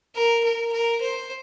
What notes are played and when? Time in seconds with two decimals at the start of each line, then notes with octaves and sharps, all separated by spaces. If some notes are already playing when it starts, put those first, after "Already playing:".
0.16 A#4
0.44 A#4
0.73 A#4
1.01 C5